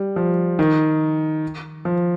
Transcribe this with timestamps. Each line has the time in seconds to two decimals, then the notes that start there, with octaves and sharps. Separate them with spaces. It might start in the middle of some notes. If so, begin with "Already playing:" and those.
Already playing: G3
0.16 F3
0.59 D#3
1.85 F3